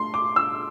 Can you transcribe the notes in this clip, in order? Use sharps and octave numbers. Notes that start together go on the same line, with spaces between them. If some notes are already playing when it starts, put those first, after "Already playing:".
Already playing: A3 C6
D6
E6